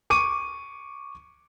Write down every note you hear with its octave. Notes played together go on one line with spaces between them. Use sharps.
C#6 D6 D#7